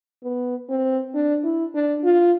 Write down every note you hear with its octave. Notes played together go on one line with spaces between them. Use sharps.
B3
C4
D4
E4
D4
F4